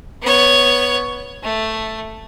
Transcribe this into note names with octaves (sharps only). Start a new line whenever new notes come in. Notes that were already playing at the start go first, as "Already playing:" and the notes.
B3 C#5
A3